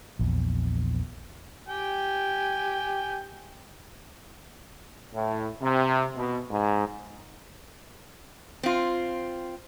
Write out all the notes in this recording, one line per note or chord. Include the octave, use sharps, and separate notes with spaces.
A#1 E2
G4 G5 G#5
A2
C3
B2
G#2
C4 F4